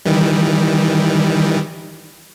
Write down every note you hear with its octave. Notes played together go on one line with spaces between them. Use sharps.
D#3 E3 G3